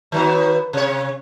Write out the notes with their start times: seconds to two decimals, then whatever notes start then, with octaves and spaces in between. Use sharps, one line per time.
0.12 D#3 F#3 B3
0.73 C3 C#5